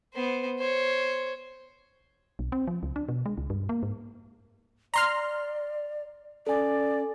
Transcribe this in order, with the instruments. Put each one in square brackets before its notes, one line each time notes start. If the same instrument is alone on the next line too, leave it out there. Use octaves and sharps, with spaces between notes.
[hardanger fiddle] B3 C5
C5 C#5
[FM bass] B1
C4
F3
C#2
D4
B2
G#3
C#2
G2
A#3
G#2
[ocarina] D5 [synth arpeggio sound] A#5 C6 F6
[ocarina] C#4 [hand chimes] A4 G#5 [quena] D5